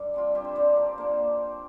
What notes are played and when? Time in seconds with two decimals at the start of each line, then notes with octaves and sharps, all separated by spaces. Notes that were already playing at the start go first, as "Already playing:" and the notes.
Already playing: G2
0.14 G3 C4 F4
0.35 G2 G4
0.45 C5
0.55 G3 C4 F4 D5
0.66 C5
0.76 F3 A#4
0.98 A#3 D4 C5